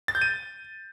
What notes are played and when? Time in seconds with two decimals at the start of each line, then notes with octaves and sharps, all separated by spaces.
0.08 A6
0.15 G6
0.22 D#7